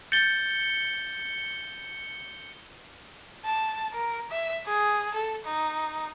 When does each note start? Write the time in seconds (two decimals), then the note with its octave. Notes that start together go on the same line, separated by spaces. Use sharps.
0.12 G6 A6 C#7 G7
3.45 A5
3.93 A#4
4.31 E5
4.66 G#4
5.14 A4
5.45 D#4